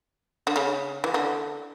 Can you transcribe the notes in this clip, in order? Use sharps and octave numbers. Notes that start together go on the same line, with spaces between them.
D3
C#3
E3
D3